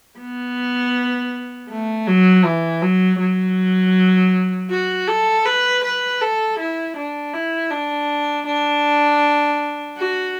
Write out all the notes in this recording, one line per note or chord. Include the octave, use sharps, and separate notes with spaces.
B3
A3
F#3
E3
F#3
F#3
F#4
A4
B4
B4
A4
E4
D4
E4
D4
D4
F#4